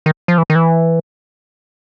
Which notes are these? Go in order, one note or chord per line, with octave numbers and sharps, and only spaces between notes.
D#3
F3
E3
D#3
E3